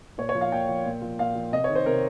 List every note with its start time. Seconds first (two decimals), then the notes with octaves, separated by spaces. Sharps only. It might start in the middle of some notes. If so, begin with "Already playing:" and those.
0.18 A#2 C#5
0.29 C#5
0.35 F3
0.41 F5
0.52 A#2 G5
0.68 F3
0.85 A#2
1.02 F3
1.19 A#2 F5
1.35 F3
1.52 C3 D#5
1.64 D#3 C#5
1.75 C5
1.85 C3 A#4